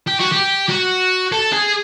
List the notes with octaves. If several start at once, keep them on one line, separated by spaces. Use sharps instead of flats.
G4
F#4
G4
F#4
A4
G#4